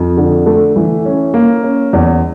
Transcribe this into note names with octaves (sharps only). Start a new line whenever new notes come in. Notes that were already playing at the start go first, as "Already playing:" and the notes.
Already playing: F2
D3
A3
E3
C#4
A#3
C#4
E2